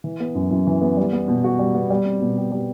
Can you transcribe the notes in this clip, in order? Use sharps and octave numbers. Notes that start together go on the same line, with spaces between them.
E3
B3
F#2
F#2
E3
B3
G3
B3
B2
F#4
G3
B3
G3
C4
B2
G4
G3